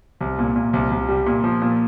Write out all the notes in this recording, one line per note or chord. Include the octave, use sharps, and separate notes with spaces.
C2
A#2
A#2
C2
C2
G3
A#2
F3
A#2